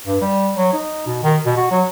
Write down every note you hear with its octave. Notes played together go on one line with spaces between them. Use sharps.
G2
G3
F#3
D#4
B2
D#3
B2
F#4
F#3